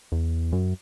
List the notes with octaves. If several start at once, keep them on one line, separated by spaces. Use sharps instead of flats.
E2
F#2